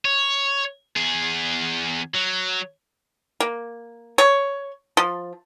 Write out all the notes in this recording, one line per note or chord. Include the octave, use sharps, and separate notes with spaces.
C#5
E2 G#4
F#3
A#3
C#5
F3